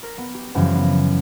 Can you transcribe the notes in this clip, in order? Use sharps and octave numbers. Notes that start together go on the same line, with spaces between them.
A#4
B3
G4
F#2 C#3 E3 F3 G3 B3
B3